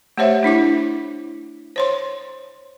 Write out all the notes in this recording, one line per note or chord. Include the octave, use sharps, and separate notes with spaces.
A3 G4 C5 C#5 E5
A3 D4 E4 D6
C5 C#5 C6